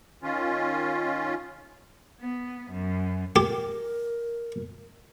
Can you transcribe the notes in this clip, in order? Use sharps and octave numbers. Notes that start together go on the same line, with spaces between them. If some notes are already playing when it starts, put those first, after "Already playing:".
D#3 C#4 F4
B3
F#2
G4 A#4